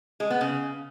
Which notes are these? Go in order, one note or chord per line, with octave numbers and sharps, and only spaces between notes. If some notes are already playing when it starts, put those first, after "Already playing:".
G#3
B3
C#3